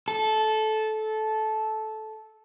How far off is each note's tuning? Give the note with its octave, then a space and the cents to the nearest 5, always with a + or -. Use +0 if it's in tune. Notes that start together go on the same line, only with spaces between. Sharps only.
A4 -15